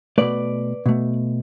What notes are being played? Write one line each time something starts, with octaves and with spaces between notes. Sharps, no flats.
B2 A3 B4 D5
B2 A3